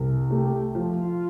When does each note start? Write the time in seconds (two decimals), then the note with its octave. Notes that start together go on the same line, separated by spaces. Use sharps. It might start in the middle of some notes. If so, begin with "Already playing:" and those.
Already playing: C2
0.30 A3 G4
0.75 F3 F4